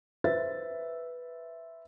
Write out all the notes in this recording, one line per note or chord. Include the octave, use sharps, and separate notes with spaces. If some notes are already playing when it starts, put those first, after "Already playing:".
B4 C5 E5 A6